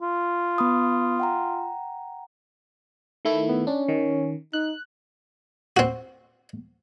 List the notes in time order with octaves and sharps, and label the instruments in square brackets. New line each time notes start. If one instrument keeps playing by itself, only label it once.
[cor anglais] F4
[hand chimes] B3 B5 D#6
F#5 G5 A#5
[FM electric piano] D#3 A3 E4
[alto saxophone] B3
[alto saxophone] C#4 [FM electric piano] D4
[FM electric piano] D#3
[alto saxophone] D#4 [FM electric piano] F#6
[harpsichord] C4 F#4